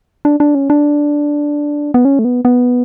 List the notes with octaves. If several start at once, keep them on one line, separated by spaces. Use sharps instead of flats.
D4
D4
C#4
D4
B3
C#4
A3
B3
B3